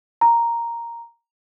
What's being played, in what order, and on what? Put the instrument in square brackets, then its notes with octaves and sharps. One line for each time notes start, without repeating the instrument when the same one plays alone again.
[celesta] A#5